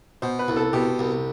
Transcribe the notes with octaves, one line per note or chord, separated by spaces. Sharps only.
B2 C5
B4
C2
A4
B2 G4
C2